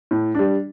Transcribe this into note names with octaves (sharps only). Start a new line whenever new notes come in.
A2
G3 D4